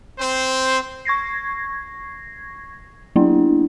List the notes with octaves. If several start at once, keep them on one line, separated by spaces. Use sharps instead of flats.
C4 C5
C#6 G#6 A#6 C7
F#3 A#3 B3 D4 E4